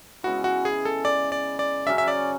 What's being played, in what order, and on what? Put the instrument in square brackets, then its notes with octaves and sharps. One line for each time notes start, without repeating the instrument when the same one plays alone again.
[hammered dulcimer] C#3 G#3 B3 E4 [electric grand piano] F#4
[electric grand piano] F#4
G#4
A4
D5
D5
D5
[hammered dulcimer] C#3 F#3 C#4 [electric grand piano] E5
[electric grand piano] E5
D5